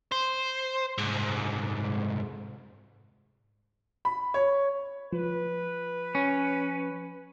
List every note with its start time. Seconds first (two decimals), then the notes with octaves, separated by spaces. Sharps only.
0.12 C5
0.98 C2 G#2
4.05 B5
4.34 C#5
5.13 F3 B4
6.15 C#4